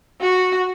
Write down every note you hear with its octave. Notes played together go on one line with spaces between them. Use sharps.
F#4